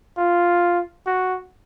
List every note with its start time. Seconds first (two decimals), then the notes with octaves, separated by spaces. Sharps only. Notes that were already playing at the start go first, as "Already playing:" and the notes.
0.18 F4
1.06 F#4